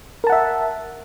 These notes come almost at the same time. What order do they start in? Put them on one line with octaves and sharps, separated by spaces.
A#4 A5 F#5 E5